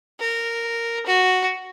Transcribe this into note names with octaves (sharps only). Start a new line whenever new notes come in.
A#4
F#4